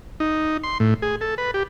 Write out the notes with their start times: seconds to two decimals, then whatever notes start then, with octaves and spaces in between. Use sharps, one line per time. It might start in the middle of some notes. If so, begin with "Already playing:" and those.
0.20 D#4
0.63 C6
0.80 A2
1.02 G#4
1.21 A4
1.38 B4
1.54 G4